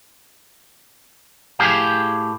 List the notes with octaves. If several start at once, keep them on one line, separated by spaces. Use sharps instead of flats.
A2 G4 G#4 F5